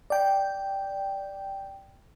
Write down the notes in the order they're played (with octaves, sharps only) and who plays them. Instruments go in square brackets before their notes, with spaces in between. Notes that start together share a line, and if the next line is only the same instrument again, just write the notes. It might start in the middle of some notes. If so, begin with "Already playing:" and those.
[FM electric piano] D5 G5